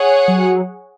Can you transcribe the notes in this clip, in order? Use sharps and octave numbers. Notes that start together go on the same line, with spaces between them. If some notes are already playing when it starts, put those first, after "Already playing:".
Already playing: G#4 C#5 F#5
F#3